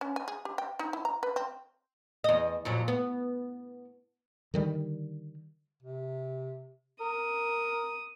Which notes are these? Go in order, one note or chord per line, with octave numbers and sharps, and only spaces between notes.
C#4
G#5
G#4
G4
G5
D#4
E4
A#5
B4
C4
E2 D#5
F2 A#2 F#3
B3
D3 D#3 G3
C3
A#4 D#6